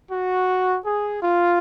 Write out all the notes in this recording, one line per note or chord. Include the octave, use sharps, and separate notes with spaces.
F#4
G#4
F4